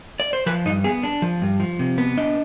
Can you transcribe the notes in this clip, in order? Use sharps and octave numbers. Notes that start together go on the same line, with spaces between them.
D5
C5
F3 B4
G2 D#4
B3 G#4
D4
F3
G2
F3
C3
B3
D4 D#5